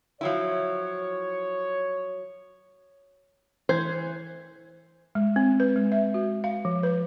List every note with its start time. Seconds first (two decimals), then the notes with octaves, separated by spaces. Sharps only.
0.21 F3 F#3 E4 C#5
3.69 E3 C5 G#6
5.15 G#3
5.36 C4
5.60 B4
5.76 G#3
5.92 E5
6.14 F#4
6.44 F5
6.65 F3
6.83 B4